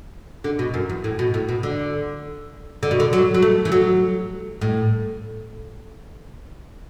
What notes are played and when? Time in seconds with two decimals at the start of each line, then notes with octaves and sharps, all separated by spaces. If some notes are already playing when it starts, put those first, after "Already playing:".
0.44 D3
0.59 B2
0.74 F#2
0.89 E2
1.04 A2
1.19 B2
1.34 A2
1.49 B2
1.63 D3
2.83 D3
2.91 B2
3.00 D3
3.13 F#3
3.34 F#3
3.42 A3
3.65 E3
3.72 F#3
4.61 A2